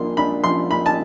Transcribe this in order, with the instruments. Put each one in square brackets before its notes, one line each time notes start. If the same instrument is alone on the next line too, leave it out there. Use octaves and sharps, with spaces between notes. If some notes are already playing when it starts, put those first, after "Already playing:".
Already playing: [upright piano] F3 A#3 D4 [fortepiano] C6
[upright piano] D4 [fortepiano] B5
[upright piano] F3 [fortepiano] C6
[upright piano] A#3 [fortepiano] B5
[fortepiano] A5